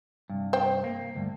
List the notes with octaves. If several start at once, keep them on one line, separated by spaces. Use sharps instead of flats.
C2 G2
C5 G5
A#3
D2 G2